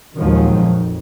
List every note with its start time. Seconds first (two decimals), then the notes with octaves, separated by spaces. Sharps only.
0.17 A#1 D#2 D#3 F3 F#3 G#3
0.58 F2